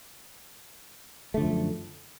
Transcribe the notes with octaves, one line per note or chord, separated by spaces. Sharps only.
F#2 D3 F3 A3